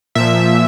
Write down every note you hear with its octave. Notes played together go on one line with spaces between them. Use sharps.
A#2 F3 E5